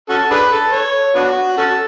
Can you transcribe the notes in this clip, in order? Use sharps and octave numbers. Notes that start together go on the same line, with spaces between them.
C#4 F#4 A4
D4 G#4 B4
A4
C#5
B3 D4 F#4
C#4 F#4 A4